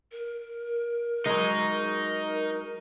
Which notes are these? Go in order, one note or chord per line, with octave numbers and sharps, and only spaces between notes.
A#4
F#3 G#3 D#4